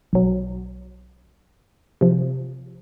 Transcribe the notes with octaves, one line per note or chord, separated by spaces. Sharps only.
B1 F#3
C3 F3